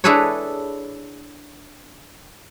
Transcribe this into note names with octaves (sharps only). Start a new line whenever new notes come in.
D4 E4 G#4 A4 B4 C#5